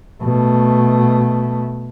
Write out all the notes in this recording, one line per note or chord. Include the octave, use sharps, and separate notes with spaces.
B2 A3